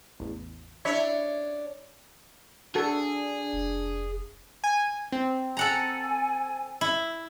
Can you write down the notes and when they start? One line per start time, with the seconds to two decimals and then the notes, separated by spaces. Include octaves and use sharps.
0.20 A1 E2
0.85 D4 E4 C#5 E5
2.75 D4 F#4 G#4 A4
3.53 F1
4.64 G#5
5.12 C4
5.57 A4 F#5 G#5 A#5
6.81 E4